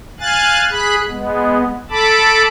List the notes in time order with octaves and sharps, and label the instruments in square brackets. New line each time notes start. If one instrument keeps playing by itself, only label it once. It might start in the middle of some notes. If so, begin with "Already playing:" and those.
[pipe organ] F5 G#5 F#6 A6
G#4 B5 F#6
G#3 B3
A4 A5 B5 D6